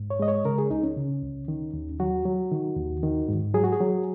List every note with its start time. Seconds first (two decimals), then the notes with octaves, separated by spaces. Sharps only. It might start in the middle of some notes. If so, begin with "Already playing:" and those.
Already playing: G#2
0.10 C#5
0.20 G#3 D#5
0.28 C#5
0.45 C#3 A#4
0.58 G#4
0.71 C#2 D#4
0.83 C#4
0.97 C#3
1.22 C#2
1.48 D#3
1.73 D#2
2.00 F#3 F#4
2.25 F#3
2.51 D#3
2.76 D#2
3.03 D#3
3.29 G#2
3.54 F#3 G#4
3.64 F#4
3.73 G#4
3.80 F#3